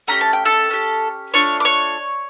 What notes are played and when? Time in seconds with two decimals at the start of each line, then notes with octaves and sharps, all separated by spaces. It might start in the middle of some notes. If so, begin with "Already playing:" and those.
0.08 A3 C#4 G4 A#5
0.21 A5
0.33 G5
0.45 A4 A5
0.70 C#4 G4
1.34 A3 D4 F4 C#5 C#6
1.60 D6
1.65 C#5 C#6